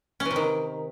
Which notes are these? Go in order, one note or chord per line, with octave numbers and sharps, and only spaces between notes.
C#4
E3
C3
D#3